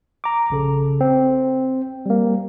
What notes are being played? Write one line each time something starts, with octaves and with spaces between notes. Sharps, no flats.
A#5 D6
A#1 C#3 A4
C4
G3 A#3